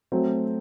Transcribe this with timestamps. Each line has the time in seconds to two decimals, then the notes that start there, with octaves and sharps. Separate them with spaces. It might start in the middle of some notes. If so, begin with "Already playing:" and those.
0.12 F#3 A3 C4